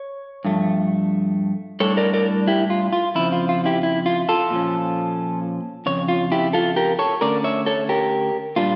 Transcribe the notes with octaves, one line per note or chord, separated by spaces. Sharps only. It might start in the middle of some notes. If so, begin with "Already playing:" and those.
Already playing: C#5
G2 F3 A3
A2 G3 D4 A4 C#5
A#4 D5
A#4 D5
E4 G4
F4
F4
F2 C#3 F3 E4
F4
F4
E4 G4
E4
F4
F4 A4
A#2 F3 C#4
F2 C#3 C#5
F4
E4 G4
F4 A4
G4 A#4
A4 C#5
D3 A3 C#4 A#4 D5
C#5 E5
A4 C#5
G4 A#4
A#2 G3 D4 F4